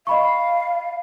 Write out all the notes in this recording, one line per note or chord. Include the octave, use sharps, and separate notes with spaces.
D#5 F5 B5 C#6